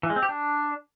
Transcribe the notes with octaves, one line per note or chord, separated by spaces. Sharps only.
E3
G#3
C4
G4
D4